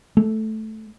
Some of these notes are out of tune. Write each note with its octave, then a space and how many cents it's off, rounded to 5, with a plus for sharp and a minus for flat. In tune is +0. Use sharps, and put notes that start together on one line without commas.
A3 -10